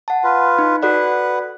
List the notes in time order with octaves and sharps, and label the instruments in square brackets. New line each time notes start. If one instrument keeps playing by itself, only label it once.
[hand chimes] F#5 A5
[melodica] F4 B4
[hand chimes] D#4
[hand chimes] F#4 A4 D5 [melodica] B4 F#5